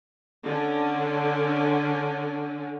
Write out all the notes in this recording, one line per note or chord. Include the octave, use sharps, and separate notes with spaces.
D3 C#4